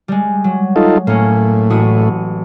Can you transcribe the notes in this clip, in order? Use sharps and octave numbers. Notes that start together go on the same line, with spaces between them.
G3 G#3
F#3
D#4 F4 A4
A2 A#3 C#4
A1 F#4 D#6